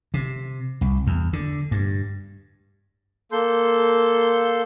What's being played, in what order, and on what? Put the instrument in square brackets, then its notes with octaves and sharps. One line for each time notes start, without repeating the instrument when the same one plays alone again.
[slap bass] C3
C2
E2
D3
G2
[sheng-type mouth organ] A#3 A4 C6 G6